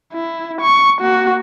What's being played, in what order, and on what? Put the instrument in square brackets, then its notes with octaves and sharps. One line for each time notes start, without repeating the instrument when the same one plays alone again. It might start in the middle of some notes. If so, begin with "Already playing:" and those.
[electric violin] E4
C#6
A#3 F#4